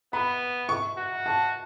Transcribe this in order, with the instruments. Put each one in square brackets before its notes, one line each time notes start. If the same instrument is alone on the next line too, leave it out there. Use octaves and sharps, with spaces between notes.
[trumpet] B3 [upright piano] B5
[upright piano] C#6
[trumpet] F#4
[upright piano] A5